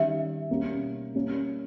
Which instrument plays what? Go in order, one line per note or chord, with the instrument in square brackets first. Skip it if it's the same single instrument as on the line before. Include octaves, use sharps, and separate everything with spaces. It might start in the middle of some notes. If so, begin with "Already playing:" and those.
Already playing: [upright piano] D#3 G3 C#4 [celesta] E5
[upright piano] B2 G3 A#3 C#4
G3 A#3 C#4